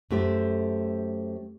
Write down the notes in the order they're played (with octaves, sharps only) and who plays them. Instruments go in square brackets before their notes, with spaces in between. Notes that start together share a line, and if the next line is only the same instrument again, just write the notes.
[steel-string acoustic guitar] F#2 A3 G4 C5